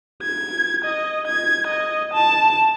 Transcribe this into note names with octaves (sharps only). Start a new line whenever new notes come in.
G#6
D#5
G#6
D#5
A5